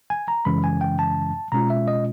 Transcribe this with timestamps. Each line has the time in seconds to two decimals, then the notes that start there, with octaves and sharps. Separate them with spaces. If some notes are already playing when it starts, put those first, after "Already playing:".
0.10 G#5
0.28 A#5
0.45 F#2 C#3 E3 G#3 C#4 B5
0.64 G#5
0.81 G5
0.99 A5
1.52 B2 G#3 C#4 F4 A#5
1.70 E5
1.88 D#5